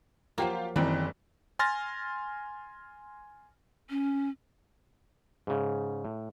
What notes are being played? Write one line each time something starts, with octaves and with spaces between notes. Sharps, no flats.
F3 F#3 A#3 F4 G4 F5
F#1 D#3 E3 G3 C4 D#4
G#5 C6 F6 A6 A#6
C#4
G#2 C#3
A2